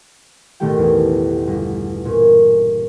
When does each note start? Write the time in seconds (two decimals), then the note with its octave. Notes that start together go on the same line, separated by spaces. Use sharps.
0.60 A1 B2 D#3 A3 G4 G5
0.78 E2
1.47 G1
2.05 A#2 C#4